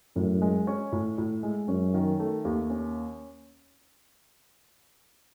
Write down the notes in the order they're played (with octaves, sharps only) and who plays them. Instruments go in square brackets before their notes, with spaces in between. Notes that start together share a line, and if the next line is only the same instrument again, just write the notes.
[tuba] F#2 [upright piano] A2
[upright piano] G#3
C#4
A2
A2
G#3
[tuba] F#2 [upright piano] C#4
[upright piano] D#3
A3
D#2
C#4